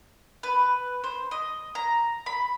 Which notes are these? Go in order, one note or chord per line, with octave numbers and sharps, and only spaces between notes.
B4
C5
D#5
A#5
B5